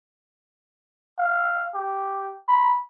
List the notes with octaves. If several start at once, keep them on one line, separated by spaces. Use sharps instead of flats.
F5
G4
B5